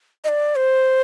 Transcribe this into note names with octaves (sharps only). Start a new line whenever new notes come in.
D#5
D5
C5